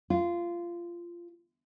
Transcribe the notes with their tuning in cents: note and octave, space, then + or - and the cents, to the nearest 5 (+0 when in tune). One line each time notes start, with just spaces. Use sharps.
F4 -15